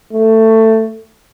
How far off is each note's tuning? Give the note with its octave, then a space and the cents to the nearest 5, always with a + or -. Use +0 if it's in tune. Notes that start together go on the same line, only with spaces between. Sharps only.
A3 +15